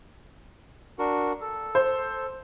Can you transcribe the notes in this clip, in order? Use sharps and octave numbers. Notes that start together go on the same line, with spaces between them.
D4 F#4 A#4
A4
C5